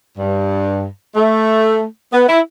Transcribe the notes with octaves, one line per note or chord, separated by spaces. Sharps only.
G2
A3
B3
E4